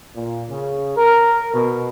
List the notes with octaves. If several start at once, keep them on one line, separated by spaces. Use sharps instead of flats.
A#2
C#3
A#4
B2